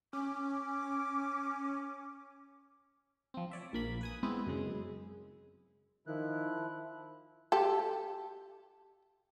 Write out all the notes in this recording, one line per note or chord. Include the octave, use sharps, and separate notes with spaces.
C#4 D6
F3 C4
C#5 D5 E5
A#1 A#3 B5
B4 G#5 D#6
G#3 B3 C4 E4
F#2 C#3 G#3
D#3 F3 E4 F#6
G4 A4